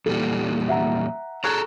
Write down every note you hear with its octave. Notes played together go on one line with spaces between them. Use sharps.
E2 A#2 G3 A4
E5 F#5 A#5
G#4 A4 A#5 C#6 F#6 G#6